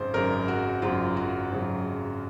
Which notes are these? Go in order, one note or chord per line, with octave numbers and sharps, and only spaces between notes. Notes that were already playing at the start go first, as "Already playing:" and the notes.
Already playing: G#1 F#2 C#3 C5
G#1 F#2 C#3 A#4
F#4
G#1 F#2 C#3 F4
F#4
G#1 F#2 C#3